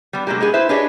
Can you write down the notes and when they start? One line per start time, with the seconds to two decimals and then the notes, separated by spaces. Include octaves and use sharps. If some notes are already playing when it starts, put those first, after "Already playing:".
0.13 G3 B3
0.27 B2 F#3 G#3 A#3 G4
0.41 G#3 B3 G#4
0.54 E4 B4 C5 E5
0.69 D4 G4 G#4 B4 C#5 D#5